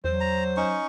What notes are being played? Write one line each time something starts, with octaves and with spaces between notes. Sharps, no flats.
E2 F#3 C5
A#5
C#4 D#4 C#6